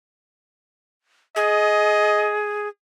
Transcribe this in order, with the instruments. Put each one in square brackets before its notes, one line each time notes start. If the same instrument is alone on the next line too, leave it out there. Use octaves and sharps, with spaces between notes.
[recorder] G#4 [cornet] D#5